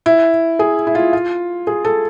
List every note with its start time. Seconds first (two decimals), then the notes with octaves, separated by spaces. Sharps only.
0.06 E4
0.59 G#4
0.87 E4
0.95 F4
1.13 F4
1.67 G#4
1.85 A4